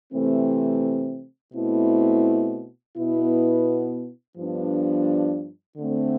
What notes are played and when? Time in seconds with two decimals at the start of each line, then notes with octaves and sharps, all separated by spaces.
0.13 C3 E3 A3 C4
1.54 B2 A3 C4 E4
2.96 B2 B3 E4
4.37 G2 F3 B3 D4
5.78 D3 A3 C4